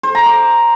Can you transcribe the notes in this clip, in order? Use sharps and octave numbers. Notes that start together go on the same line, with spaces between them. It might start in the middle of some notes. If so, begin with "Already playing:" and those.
C5
A#5
D6